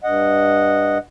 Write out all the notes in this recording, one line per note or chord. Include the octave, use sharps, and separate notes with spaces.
G2 D#5 F#5